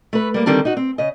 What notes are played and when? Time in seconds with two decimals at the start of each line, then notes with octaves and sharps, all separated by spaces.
0.13 A3 B4
0.34 G3 A#3
0.46 D3 D#3 G3 C4 D4
0.65 D#4 F#4
0.77 C4
0.98 C#3 D#5